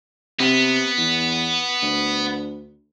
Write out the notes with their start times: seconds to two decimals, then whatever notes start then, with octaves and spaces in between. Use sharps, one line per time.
0.40 C3 B3
0.98 E2
1.82 D2